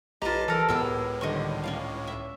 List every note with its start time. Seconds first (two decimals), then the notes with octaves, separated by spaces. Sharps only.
0.22 B1 F4 G4 B4 D#5 A5 A#5
0.48 E3 A4 A#4
0.69 C#2 A2 B3 G4 G#4 A#4 E6
1.21 D3 D#3 G3 D#5 C#6
1.63 C#4 D5 F5
2.07 E5